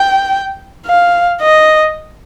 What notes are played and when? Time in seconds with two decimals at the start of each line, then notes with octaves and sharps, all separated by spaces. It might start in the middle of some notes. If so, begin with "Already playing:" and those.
Already playing: G5
0.87 F5
1.41 D#5